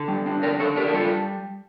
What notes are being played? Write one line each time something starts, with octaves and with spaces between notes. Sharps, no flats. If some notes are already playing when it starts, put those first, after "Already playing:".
Already playing: D3
G3
D4
D3 A#4 D5
D3 A4 C#5
D4 G4 A#4
A#4
G3 F4 A4